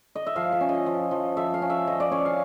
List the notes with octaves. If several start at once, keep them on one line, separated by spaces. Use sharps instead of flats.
D#5
E5
F3 F5
E5
C#4
D#5
F3
F3
F3 E5
F5
C#4
E5
F3 D#5
D5
C#4 C#5
F5